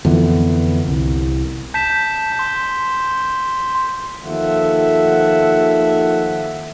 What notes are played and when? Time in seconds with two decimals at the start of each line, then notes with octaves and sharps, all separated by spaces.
0.05 F2 D3 E3 B3
0.88 C2
1.74 A5 G6 B6 E7
2.39 C6
4.23 D#2 F3 A4 E5 F#5